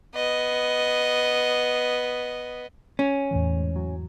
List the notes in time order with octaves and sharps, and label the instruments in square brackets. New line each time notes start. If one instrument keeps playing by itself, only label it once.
[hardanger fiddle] B3 D#5
[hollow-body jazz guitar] C#4
[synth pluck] E2 A2 E3
G#2
F#3